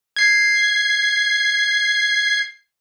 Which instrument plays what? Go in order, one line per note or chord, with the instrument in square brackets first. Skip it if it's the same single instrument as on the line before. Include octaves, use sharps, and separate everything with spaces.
[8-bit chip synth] G#6 C7